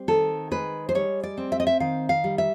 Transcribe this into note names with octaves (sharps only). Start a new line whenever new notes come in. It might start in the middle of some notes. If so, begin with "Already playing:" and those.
Already playing: G3 C4
D#3 A4
G#3 B4
C5
G3 C#5
D5
C4
E5
D#5
E5
D#3 F5
F5
G3
E5